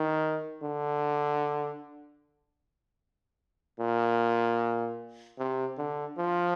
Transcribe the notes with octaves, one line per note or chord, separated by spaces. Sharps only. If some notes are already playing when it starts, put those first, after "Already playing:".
Already playing: D#3
D3
A#2
C3
D3
F3